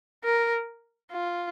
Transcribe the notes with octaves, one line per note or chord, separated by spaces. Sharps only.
A#4
F4